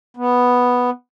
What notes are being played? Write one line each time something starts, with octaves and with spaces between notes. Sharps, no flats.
B3